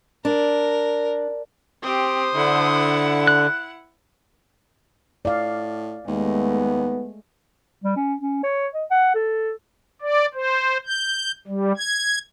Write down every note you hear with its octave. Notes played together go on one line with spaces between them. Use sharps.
D4 A#4
C4 G4 C5 D#6
D3 E4 F#5
F#6
A2 D5 F5
D#2 G#3 A3 B3
G3
C#4
C#4
C#5
D#5
F#5
A4
D5
C5
G6
G3
G#6